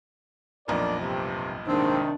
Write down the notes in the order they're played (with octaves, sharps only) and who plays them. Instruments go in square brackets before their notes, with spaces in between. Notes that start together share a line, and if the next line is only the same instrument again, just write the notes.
[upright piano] B1 F2 A#2 [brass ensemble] D4 A#4 D5
[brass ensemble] G2 C3
[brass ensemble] C2 C3 D#3 [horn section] G#2 A#3 C4 [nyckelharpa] D4